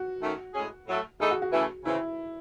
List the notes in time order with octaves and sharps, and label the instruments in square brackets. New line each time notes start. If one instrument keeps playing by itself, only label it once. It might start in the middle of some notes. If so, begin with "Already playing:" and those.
Already playing: [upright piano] F#4
[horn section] D#3 A3 C#4
A2 G#3 C#4 G#4
A2 F#3 A3
[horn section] E3 A3 D#4 A4 [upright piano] G#4
[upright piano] F#4
F#4
[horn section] C#3 E3 A3
[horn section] C#3 E3 C4 [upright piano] E4